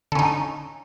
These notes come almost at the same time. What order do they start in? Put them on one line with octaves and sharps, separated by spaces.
D3 C#4 D#4